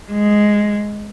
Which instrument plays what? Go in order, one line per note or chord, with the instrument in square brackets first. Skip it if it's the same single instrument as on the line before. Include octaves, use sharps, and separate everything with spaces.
[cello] G#3